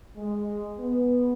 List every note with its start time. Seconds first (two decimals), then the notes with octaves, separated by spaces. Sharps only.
0.16 G#3
0.78 B3